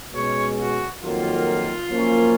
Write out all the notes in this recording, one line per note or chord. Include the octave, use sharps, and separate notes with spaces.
B2 G#3 C#4 C#5
F#4
F2 D#3 F#3 A#3 F4
F#2 F3 A#3 C#4